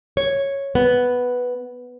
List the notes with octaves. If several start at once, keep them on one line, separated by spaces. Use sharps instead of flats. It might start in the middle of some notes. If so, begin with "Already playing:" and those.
C#5
B3